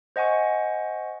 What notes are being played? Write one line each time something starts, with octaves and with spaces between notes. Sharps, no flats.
C5 D#5 F#5 G#5 C#6